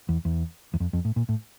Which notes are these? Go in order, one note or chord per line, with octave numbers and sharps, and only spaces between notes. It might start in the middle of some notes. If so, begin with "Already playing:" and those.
E2
E2
E2
F2
F2
A2
A#2
A2